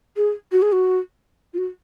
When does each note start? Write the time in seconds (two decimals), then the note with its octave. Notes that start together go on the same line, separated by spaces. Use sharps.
0.17 G#4
0.52 F#4
0.62 G#4
0.72 F#4
1.54 F4
1.58 F#4